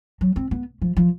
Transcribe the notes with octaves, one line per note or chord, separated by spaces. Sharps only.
F#3
C4
B3
F3
F3